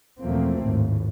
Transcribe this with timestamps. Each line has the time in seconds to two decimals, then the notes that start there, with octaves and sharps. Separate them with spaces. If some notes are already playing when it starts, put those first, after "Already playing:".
0.21 E2 B2 F3 A3 A#3 C4
0.63 G#1 D#2 A2